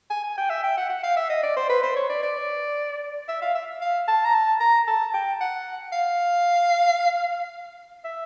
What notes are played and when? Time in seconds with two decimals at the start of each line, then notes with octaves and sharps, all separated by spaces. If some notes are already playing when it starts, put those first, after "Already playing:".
0.11 G#5
0.24 G#5
0.38 G5
0.50 E5
0.64 G5
0.78 F#5
0.90 F#5
1.03 F5
1.17 E5
1.30 D#5
1.43 D5
1.57 C5
1.69 B4
1.83 C5
1.96 C#5
2.09 D5
2.23 D5
3.29 E5
3.42 F5
3.55 E5
3.81 F5
4.08 A5
4.25 A#5
4.34 A5
4.61 A#5
4.88 A5
5.14 G5
5.41 F#5
5.93 F5
8.05 E5